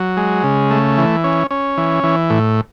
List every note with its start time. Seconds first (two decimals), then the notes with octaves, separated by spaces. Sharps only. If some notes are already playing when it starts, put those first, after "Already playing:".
Already playing: F#3
0.17 G#3
0.44 C#3
0.71 A3
0.98 E3
1.24 C#4
1.51 C#4
1.78 E3
2.04 E3
2.30 A2